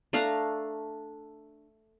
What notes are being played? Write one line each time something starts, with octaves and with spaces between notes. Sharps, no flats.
A3 D4 F5 A#5